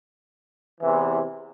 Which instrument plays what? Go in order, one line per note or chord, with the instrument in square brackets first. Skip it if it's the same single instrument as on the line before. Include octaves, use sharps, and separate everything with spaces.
[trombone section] E2 C3 E3